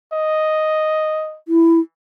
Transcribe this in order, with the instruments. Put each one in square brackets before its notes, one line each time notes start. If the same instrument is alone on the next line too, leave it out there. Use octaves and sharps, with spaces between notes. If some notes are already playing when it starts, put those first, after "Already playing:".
[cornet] D#5
[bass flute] E4